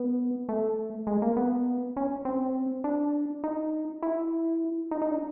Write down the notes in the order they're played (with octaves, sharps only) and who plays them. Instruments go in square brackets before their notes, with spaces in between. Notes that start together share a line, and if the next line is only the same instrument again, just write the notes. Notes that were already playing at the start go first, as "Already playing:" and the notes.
Already playing: [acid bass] B3
A3
G#3
A#3
B3
C#4
C4
D4
D#4
E4
D#4
D#4
D4